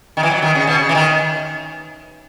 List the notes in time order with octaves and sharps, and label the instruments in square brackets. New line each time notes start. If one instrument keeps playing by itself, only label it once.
[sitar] D#3
E3
F#3
D#3
C#3
B2
C#3
E3
D#3